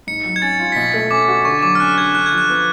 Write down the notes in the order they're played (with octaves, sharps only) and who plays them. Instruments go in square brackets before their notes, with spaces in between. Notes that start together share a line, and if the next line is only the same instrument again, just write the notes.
[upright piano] G#2 [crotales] C#7
[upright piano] F#3
[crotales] G#6
[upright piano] C#4 [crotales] A6
[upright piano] F4
[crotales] B6
[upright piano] B2 [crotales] A6
[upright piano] A3
[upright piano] C#4 [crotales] D6
[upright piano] F#4
[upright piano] D3 [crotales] C#6
[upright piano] F#3 [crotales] D6
[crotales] F6
[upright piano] C#4 [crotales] F#6
[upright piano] D3 [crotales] G#6
[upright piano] D3 [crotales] F#6
[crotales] G#6
[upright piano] F3
[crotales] F#6
[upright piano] B3